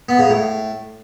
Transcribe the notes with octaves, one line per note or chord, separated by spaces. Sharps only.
B3
C#3
A2